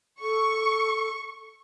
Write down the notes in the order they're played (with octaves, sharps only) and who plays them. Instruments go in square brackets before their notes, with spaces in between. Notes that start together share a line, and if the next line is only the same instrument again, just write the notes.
[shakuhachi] A4 [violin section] C#6